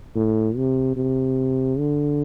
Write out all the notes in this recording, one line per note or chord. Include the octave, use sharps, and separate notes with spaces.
A2
C3
C3
D3